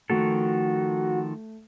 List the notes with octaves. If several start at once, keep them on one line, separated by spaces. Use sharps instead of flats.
D#3 F3 A3 F#4 A4